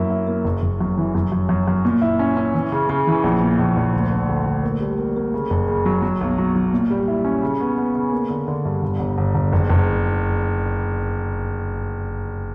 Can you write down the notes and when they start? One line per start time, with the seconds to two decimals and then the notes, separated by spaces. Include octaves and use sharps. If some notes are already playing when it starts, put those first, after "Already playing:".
Already playing: F#2 A#3 E4
0.10 E4
0.27 A#3
0.44 F#1
0.62 F#1
0.81 F#2
0.97 E3
1.15 F#2
1.32 F#2
1.49 F#2
1.68 F#2
1.85 A#2
2.02 E4
2.19 C#4
2.37 C#4
2.54 E3
2.72 C#3
2.89 C#3
3.07 E3
3.24 A#1
3.42 A#2
3.59 A#1
3.77 A#1
3.93 D2
4.11 D3
4.29 D2
4.46 D2
4.63 A#3
4.81 G3
4.98 A#3
5.16 A#3
5.34 C#3
5.50 F#1
5.68 C#3
5.86 F#3
6.02 F#3
6.21 B1
6.38 F#3
6.56 F#3
6.73 A#2
6.90 G3
7.08 E4
7.25 C#4
7.43 C#3
7.61 B3
7.78 B3
7.95 C#3
8.12 A#3
8.30 D3
8.48 D3
8.65 G2
8.82 G1
8.99 G1
9.18 G1
9.34 G1
9.52 F#1
9.69 F#1